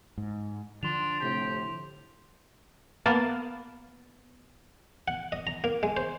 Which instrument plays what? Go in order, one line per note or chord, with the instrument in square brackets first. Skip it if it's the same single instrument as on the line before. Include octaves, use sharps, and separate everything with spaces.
[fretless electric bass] G#2
[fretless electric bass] D3 F3 [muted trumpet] D4 [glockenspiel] C6 E7 F7
[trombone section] A2 C3 [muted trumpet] G4
[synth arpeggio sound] A#3 [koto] B3 F5 A5
[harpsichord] F#5
D#5
A#5
A#3
G#3
C5